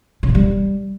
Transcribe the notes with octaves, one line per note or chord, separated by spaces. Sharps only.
C#3
A#2
G3